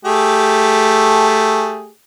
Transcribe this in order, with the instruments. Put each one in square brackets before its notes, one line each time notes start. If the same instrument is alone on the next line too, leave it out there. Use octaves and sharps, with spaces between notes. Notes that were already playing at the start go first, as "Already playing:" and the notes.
[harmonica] A3 G4 G#4